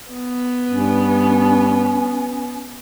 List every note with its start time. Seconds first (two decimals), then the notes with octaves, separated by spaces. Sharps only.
0.12 B3
0.69 G2 C#4